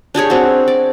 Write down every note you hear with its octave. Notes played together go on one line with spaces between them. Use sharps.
D4 G4 G#4 C#5
C4 F#4
D5